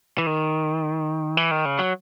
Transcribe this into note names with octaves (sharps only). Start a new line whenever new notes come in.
E3
D#3
E3
D#3
C#3
F#3